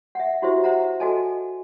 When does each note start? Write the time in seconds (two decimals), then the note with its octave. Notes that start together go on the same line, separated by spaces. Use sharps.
0.15 E5 F#5
0.42 E4 F#4 G4 C5 E5
0.64 C5 E5 F#5 A#5
1.00 F#4 A4 D#5 G#5 A5